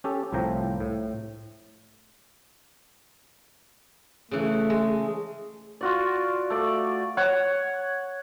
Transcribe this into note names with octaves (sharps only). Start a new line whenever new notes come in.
C#4 G4 A4
C2 A2 F3 G5 A#5
A2
C#3 E3 A3
G#3
F4 F#4 D5
A3 D5
C#5 F#5